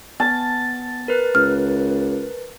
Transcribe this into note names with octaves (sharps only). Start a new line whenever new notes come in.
B3 A5
A#4 B4 F#6
C#2 F6